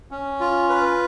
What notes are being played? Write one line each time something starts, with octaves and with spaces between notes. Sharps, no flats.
C#4
F4
B4